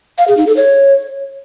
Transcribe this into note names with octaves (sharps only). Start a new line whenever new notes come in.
F5
G#4
D#4
A4
C#5